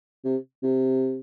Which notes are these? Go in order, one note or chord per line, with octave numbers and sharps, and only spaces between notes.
C3
C3